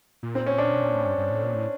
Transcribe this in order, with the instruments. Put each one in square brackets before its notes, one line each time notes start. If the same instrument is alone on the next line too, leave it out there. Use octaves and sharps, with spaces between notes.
[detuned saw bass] A#2
[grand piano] C4
C#4
D4
[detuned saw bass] B2
A#2
A2
G2
G2
A2
A#2
A2